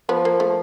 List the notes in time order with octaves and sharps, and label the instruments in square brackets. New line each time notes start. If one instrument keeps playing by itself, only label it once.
[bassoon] F3 [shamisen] B3
[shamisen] A#3
A3